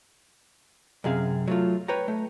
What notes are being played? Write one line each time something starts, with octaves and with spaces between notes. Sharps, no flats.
F#2 C3 G#4 F5
F#3 A3 F4
B4 C#5 G5 A#5
A3